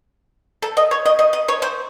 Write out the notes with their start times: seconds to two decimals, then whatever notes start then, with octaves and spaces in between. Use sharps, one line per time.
0.62 A4
0.77 D#5
0.91 C#5
1.06 D#5
1.19 D#5
1.33 D#5
1.48 C#5
1.62 C5